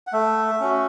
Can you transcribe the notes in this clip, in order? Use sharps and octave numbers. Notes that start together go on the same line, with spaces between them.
F#5
A3 E5
C#4 F#4